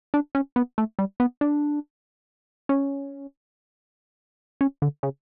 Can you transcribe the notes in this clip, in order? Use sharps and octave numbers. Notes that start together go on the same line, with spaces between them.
D4
C#4
B3
A3
G3
B3
D4
C#4
C#4
D3
C#3